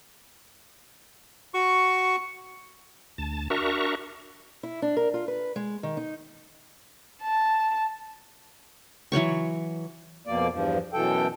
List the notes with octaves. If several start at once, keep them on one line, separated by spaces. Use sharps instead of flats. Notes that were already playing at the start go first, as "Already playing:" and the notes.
F#4 C#6
D2 A5
D4 F#4 A#4 E5 A#5 C#6
E4
D4
A#4
F4
B4
G#3
D#3
D#4
A5
E3 F#3 C#5 C#6
F2 B2 A#3 D5
E2 G2 F3
F#2 B2 E3 A4 G5